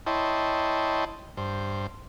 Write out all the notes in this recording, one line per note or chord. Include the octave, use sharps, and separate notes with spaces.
E4 C#5 D#5 G5 A5 C6
G2 C5